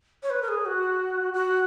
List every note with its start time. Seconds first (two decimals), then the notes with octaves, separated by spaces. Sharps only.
0.23 C#5
0.30 B4
0.42 A#4
0.48 G#4
0.65 F#4
1.33 F#4